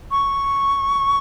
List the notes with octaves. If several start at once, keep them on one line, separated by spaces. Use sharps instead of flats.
C#6